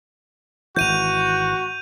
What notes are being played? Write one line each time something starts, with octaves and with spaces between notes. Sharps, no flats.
G#1 E3 F#4 G6 D#7 F7